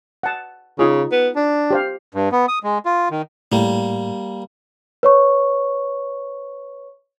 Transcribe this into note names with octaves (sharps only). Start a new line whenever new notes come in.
F#5 A5
C#3 D#4 F4 G#4
B3
D4
G4 C5 F5
G2
B3
D#6
G#3
F4
D#3
A2 G3 A#3
B4 C#5 C#6